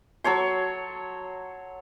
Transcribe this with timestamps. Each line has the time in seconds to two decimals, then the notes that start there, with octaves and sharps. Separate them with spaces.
0.24 F#3 A4 C#5 C6